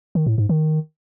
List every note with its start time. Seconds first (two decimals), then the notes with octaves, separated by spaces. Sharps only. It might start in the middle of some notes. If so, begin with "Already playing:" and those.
0.15 D#3
0.27 A2
0.38 G#2
0.49 D#3